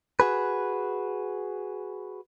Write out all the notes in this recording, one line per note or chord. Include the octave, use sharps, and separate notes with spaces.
F#4 G#4 B4